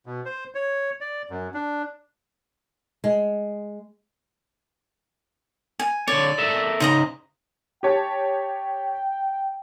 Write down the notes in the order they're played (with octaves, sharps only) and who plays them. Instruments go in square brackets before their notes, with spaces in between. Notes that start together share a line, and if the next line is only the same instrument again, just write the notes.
[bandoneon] B2
C5
C#5
D5
F#2
D4
[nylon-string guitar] G#3
[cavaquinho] G#5
[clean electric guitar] D3 C#5 [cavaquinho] D5
[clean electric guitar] A4 A#4 E5
[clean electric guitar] C#3 D#4 [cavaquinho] C5 D#5 A#5
[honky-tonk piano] G4 C#5 A5 [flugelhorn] G5